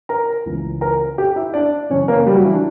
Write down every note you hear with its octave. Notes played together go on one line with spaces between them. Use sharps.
A#4 A#5
C#2 C#3 E3
A#4 A#5
G4 G5
E4 E5
D4 D5
F#2 C#3 E3 C#4 C#5
A#3 A#4
G3 G4
F#3 F#4
E3 E4
D4